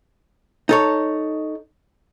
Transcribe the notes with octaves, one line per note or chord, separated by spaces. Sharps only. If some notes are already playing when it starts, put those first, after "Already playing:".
D#4 A4 C#5